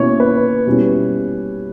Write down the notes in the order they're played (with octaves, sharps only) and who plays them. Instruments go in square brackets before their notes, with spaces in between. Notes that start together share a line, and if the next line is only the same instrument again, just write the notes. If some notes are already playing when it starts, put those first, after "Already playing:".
Already playing: [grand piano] B2 A#3 C#4 E4 C#5
B4
B2 G3 C#4 E4